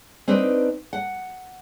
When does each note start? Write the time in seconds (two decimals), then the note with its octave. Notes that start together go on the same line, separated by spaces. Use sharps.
0.28 C4 D4 D#4 B4
0.93 F#5